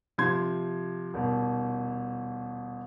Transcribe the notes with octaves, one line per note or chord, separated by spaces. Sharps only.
C3 F3 C6 G#6
D#1 B2